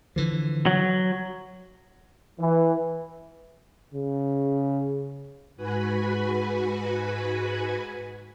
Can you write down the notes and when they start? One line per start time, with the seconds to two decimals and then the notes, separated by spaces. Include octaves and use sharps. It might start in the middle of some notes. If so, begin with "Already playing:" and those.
0.16 D3 E3 F3
0.66 F#3
2.39 E3
3.94 C#3
5.56 G#2 F#4 B4 G#5 B5